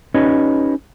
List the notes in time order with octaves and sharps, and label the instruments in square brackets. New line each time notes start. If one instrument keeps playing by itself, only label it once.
[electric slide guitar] C#4 D#4 G4 B4 C#5 D#5